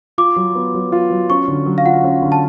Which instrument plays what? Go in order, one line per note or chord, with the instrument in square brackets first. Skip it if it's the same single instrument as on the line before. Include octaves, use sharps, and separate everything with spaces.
[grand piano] F4 [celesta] D6
[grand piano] F#3
B3
F#3
F4
F#3
[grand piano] C#4 [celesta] C#6
[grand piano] D3
F#3
[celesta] F5
[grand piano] F4 [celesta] F#5
[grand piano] C#4
D3
[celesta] A5